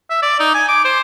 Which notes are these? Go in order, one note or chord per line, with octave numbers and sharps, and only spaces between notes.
E5
D5
D#4
G#5
D6
C5